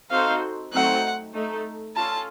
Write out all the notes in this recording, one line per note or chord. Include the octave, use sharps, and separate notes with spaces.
C4 D#4 F#4 A4 C5 F5
F#3 A3 C4 D#4 F#5
A3 D#4 A4
C#4 F4 A4 A5